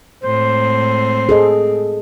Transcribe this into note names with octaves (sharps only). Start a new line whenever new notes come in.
A2 G#3 C4 C5
G#4 A4 D#5